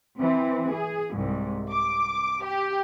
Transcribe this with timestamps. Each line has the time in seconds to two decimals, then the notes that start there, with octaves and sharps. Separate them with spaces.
0.19 E3 C4
0.71 G#4
1.15 C2 G#2
1.72 D6
2.45 G4